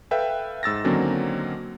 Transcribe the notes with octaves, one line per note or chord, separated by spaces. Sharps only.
A4 B4 E5 F5 G5
G#2 E6 A6 A#6
D3 D#3 F#3 A#3 C4 C#4